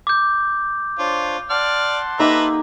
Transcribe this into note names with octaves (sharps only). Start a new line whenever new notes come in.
D6 G6
D4 F4 C5 C#5
D5 F#5 A5 C6 F6
A#3 D#4 G4 B4 E5 A#5